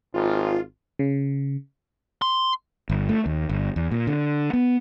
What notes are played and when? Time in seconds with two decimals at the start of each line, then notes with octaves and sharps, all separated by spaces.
0.14 G#1 F4
0.99 C#3
2.22 C6
2.90 G1
3.09 A3
3.26 D#2
3.49 G1
3.76 E2
3.91 A#2
4.07 D3
4.53 B3